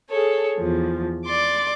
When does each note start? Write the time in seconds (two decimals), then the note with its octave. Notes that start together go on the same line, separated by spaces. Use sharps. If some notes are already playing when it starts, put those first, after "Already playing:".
0.10 G#4 A4 C#5
0.60 E2 F3
1.27 D5 C6 D6